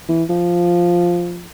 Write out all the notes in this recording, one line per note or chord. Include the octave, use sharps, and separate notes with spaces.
E3
F3